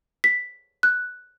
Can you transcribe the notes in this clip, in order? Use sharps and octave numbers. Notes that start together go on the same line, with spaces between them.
B6
F#6